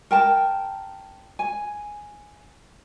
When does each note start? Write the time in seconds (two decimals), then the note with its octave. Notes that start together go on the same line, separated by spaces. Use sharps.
0.11 A#4 G5 A5
1.39 G#5